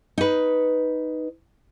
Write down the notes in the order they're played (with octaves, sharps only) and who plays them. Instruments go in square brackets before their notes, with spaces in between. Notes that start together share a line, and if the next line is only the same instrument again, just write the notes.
[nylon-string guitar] D#4 B4